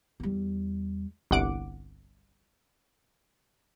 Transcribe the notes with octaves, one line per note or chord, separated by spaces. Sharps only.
E2 G3
G1 C2 F#5 D6 D7